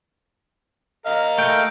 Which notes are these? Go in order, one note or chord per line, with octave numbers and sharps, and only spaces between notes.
A#4 D#5 F5
A3 G5